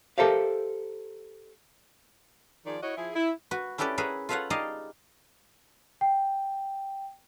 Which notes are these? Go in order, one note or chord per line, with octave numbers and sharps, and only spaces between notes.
G4 A4 A#4 C5 E5 F5
D#3 F3 G#4 D5
E4 F#4 C#5 D#5
F3 E4 G#4
E4
F#4 B4
C#4 E4 G4 A4 B4 D5
G#4 A#4 B4 C#5 E5 F#5
F4 A4 B4 C#5 F5 F#5
D#4 G4 G#4 D5 D#5 F5
G5